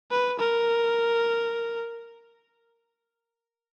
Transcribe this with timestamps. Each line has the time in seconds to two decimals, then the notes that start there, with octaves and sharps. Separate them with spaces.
0.11 B4
0.39 A#4